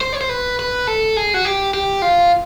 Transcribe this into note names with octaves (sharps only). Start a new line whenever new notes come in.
C5
C#5
C5
B4
B4
A4
G#4
F#4
G4
G4
F4